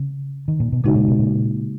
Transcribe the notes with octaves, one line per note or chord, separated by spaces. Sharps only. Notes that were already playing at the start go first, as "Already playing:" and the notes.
Already playing: C#3
D#3
A#2
B2
A#2 C#3 G#3 D#4 F#4
A#2
B2
A#2